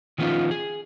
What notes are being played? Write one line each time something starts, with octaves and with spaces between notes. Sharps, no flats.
D#3 F3 B3 C#4 D#4 F4
G#4